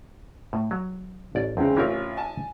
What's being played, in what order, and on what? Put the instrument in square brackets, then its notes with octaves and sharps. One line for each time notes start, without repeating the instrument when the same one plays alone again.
[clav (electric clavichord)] A2
F#3
A1 D5
[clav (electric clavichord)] E2 [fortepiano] C#3 G#3 C4
[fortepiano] A1 F4 C#5 [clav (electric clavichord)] E3 C4 A#4
[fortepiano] G#5 A5